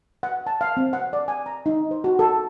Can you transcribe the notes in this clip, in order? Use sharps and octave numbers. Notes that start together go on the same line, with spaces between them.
F#5
A5
F5
C4
F#5
D5
G#5
A#5
D#4
C5
F#4
A4